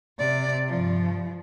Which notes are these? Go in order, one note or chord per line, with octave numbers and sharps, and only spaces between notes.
C3 D5
G2 F3